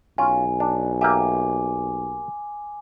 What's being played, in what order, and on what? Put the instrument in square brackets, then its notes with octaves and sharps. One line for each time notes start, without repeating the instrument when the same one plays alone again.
[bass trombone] B1 [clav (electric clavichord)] C#4 F4 [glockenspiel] G#5
[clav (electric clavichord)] D4
[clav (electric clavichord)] A#3 G4 E5 [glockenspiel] G#5 D6